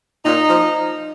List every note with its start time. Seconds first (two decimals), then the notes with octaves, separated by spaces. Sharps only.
0.25 A#2 D#4
0.49 F3